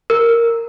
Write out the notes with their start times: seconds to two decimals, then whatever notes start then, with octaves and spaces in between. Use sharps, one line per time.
0.10 A#4